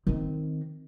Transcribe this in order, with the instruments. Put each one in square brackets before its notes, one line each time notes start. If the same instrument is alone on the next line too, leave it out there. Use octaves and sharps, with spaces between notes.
[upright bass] D#3 C4